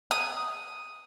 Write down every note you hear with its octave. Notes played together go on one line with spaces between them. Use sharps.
D#6